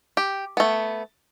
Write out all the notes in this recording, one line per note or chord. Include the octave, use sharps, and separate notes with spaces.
G4
A3 B3